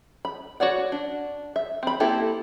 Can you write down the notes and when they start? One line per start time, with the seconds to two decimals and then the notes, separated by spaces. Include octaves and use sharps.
0.25 B5
0.60 F#4 C#5 D5 F#5
0.92 D4
1.56 E5
1.83 C4 B5
2.00 A#3 C4 E4 G4 A4